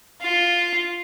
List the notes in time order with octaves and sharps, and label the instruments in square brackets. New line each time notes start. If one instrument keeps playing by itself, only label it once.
[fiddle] F4